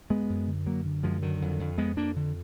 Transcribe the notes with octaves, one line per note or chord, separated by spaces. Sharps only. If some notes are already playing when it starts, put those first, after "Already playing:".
F#2 G#3 B3
F#2
D3
F#2 F#3 A#3
D3
F#2 F3 G#3
D3 D#3 F#3
F2
F2
F2 G#3 B3
F2 A#3 D4
D3